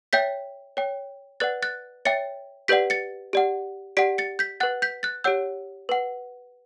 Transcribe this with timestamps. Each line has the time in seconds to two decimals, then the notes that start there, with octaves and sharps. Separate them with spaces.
0.13 C#5 E5 G5 G6 B6
0.77 C#5 G5
1.40 B4 D5 F#5 F#6 A6
1.63 F#6 A6
2.05 C#5 E5 G5 A6 C#7
2.68 G4 B4 D5 F#5 G6 B6
2.90 A6 C#7
3.33 G4 D5 F#5
3.97 G4 D5 F#5 B6 D7
4.18 A6 C#7
4.39 G6 B6
4.60 B4 F#5 F#6 A6
4.82 G6 B6
5.03 F#6 A6
5.24 G4 C#5 F#5 E6 G6
5.89 B4 F#5